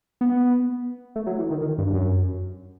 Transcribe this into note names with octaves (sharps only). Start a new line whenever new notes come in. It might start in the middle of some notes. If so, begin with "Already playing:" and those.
B3
A3
F#3
E3
D#3
D#3
G2
F#2